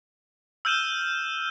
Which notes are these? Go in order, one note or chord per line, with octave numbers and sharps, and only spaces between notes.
E6 F6 G6 D#7 E7 G7